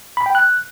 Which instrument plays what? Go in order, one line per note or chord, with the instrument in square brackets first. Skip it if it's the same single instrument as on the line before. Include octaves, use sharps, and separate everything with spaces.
[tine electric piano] B5
G5
F#6